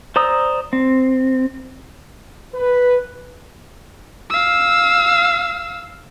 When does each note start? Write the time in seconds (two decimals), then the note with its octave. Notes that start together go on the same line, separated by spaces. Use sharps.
0.16 C5 D5 A#5 D#6 E6
0.73 C4
2.55 B4
4.30 F5 E6